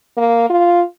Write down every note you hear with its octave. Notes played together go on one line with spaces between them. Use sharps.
A#3
F4